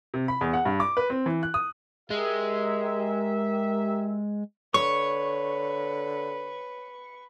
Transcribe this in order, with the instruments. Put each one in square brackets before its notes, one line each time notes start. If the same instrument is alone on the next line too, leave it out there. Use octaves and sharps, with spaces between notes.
[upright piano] C3
B5
E2
F#5
G2
D6
B4
C4
E3
F#6
D#6
[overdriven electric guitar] G#3 [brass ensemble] G4 A#4 E5
[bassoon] D3 [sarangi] B4 [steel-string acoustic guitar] C#5 [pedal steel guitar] C#6